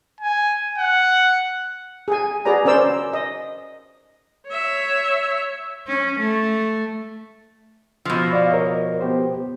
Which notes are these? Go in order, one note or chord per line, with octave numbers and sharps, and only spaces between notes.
G#5
F#5
G#4 G#5
F#4 G#4 B4 D5 A#5
C#4 A#4 C5 D5 E6
D#5
C#5 E5
C#4
A3
B2 F3 E6
D5 F5
A#4 C#5 D#5
B3 G4 C5